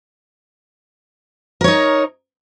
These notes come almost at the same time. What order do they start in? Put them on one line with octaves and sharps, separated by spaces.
A#4 C#5 D#4